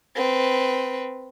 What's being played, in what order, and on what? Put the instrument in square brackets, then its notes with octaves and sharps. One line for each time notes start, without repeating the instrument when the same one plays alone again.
[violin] C4 B4